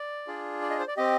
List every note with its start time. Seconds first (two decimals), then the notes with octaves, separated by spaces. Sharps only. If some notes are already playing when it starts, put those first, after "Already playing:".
Already playing: D5
0.27 D4 F4 G#4
0.62 D5
0.70 D#5
0.79 C5
0.88 D5
0.97 C4 G4 D#5